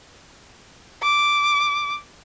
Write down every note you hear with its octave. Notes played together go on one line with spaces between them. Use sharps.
D6